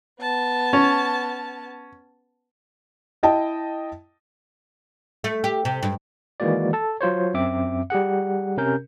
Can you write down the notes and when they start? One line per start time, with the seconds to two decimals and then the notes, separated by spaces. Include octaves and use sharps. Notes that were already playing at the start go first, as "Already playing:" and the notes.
0.21 B3 A5
0.73 C#4
3.23 E4 D#5 G5 A5
5.24 A3
5.44 G4
5.65 C3
5.83 G2
6.40 D#3 E3 G#3 A#3 F#4 D5
6.73 A4 A5
7.01 F#3 F4 C5 C#5
7.34 F#2 C4 E5 D6
7.90 G3 G4 G#4 F#5
8.57 C3 C#4 A#4 G6